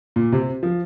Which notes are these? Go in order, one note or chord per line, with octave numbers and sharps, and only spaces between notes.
A#2
C3
F3